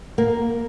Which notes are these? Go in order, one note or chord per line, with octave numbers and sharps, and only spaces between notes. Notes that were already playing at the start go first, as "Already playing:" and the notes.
A#3